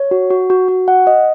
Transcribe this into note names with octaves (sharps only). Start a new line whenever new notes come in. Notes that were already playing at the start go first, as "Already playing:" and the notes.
Already playing: C#5
F#4
F#4
F#4
F#4
F#5
D#5